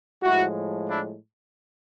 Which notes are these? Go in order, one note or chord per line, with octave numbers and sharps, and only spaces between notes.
A2 F3 G#3 E4 F#4
D4 E4